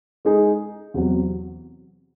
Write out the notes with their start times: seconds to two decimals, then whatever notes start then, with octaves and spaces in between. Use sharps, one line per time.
0.25 G#3 D#4 G#4
0.94 E2 C3 F#3